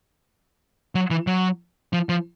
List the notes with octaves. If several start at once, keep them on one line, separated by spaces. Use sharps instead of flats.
F#3
E3
F#3
F3
F3